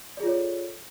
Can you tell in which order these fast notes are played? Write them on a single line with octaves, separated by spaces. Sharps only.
D5 G#4 F4 C#5 A4